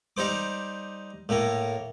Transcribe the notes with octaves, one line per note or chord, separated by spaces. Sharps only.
G3 D#4 C5 D6
A2 A#3